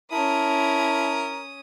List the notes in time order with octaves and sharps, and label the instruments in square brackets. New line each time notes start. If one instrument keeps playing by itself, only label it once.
[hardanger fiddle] C#4 D#6 [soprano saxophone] E4 [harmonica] A#4 [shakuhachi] A5